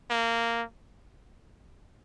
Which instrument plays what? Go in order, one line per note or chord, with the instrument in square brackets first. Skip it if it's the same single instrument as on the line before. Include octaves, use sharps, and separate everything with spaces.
[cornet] A#3